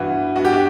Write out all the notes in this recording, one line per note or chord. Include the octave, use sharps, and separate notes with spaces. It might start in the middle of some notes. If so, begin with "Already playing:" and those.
Already playing: G2 E3 F#4
G2 F#4
G4
F#4